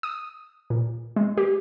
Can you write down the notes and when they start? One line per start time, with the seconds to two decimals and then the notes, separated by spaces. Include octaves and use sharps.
0.03 D#6
0.70 A#2
1.16 G#3
1.38 G4